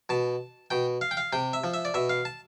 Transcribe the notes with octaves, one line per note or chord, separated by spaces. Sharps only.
B2 A5
B2 G5
F5
G5
F5
C3 G5
E5
F3
E5
D5
B2 E5
F5
A5